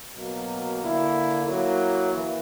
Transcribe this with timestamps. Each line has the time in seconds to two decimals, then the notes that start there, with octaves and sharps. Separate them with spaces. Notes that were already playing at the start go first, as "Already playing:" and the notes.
0.14 B2 F#3 A#3
0.80 D3 A#3 E4
1.46 F#3 A#3 E4
2.11 E3 A#3